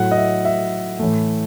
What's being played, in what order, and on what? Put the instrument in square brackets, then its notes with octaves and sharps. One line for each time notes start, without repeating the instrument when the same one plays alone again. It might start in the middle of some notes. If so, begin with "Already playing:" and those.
Already playing: [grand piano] A2 F#3 A3 F#5
D#5
E5
E5
A2 E3 A3